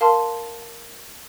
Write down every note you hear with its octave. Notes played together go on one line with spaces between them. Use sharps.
A#4 F5 A5 C6